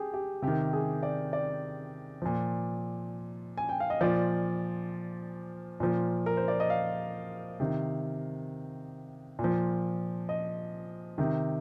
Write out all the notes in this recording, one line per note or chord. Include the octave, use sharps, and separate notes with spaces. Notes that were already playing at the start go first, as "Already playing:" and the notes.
Already playing: G4 G#4
G4
C3 D#3 G4
G#4
D5
D5
A#2 F3
G#5
G5
F5
D#5
A#2 F3 D5
A#2 F3
A#4
C5
D5
D#5
F5
C3 D#3
A#2
F3
D#5
C3 D#3